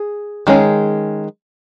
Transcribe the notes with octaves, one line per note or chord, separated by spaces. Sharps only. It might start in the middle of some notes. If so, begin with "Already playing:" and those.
Already playing: G#4
D#3 G#3 C#4 G#4